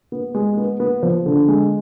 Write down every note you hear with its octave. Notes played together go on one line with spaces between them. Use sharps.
B3
G#3
B3
B3
F3
D3
G#3